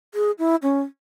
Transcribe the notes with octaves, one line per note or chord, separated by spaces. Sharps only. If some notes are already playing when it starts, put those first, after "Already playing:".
G#4
E4
C#4